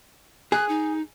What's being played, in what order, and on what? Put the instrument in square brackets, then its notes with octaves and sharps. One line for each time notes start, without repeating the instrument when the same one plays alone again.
[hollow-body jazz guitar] G#4 [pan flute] F#6
[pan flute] D#4